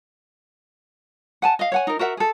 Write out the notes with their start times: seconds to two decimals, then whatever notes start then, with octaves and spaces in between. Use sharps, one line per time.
1.42 F#5 G#5 A5
1.59 D#5 F5
1.72 C#5 F#5 G#5
1.87 D#4 A#4
1.99 F#4 A#4 E5 F#5
2.17 G#4 A4